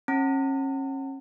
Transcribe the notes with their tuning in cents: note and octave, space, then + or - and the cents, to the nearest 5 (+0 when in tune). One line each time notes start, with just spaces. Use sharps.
C#4 -35 A5 +45